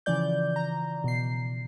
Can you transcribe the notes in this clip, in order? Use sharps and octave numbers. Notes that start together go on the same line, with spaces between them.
C#3 E3 F3 D5 G6
A#5
B2 C7